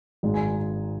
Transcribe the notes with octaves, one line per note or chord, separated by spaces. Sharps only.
G#1 G#2 G#3
G#5